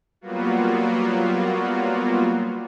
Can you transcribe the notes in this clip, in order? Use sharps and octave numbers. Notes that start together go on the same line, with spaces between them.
F#3 G3 A#3 B3 F4 F#4